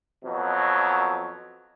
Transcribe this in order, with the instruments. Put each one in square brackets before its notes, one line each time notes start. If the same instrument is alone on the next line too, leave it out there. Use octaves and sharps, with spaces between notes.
[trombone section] F2 B2 F#3